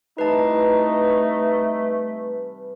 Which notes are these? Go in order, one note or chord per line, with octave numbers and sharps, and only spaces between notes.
C3 E3 G3 A3 D#4 B4 A5